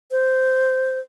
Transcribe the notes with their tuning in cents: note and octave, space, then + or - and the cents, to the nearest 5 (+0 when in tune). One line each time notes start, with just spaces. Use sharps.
C5 -10